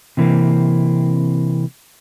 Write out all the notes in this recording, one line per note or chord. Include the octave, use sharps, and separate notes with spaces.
C3 E3 A#3 C4